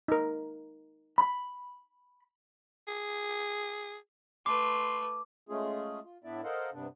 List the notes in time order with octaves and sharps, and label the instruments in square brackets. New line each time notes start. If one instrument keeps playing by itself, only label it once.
[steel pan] D#4 A#4
[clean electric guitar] B5
[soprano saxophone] G#4
[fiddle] A3 B4 [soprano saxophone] C6 [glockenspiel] D6
[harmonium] G#3 A3 C#4 F4 G#4
F4
A2 B3 D4 E4 D5 E5
A4 A#4 C5 D#5 F5 F#5
G2 C3 B3 D4